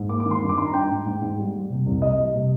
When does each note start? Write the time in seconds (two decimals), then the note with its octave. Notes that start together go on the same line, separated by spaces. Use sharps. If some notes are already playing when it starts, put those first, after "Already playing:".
Already playing: G#2
0.09 A#3 D6
0.20 D6
0.26 D#3
0.31 C6
0.42 G2
0.49 D6
0.57 D#4 C6
0.65 A#5
0.74 D4 G5
0.90 G#2
1.06 G#2
1.22 G#2
1.38 G3
1.54 G3
1.70 C3
1.86 C2
2.02 G3 D#5
2.18 G3
2.35 C3